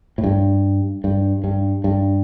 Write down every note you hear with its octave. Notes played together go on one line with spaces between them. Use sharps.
A2
G2
G2
G2
G2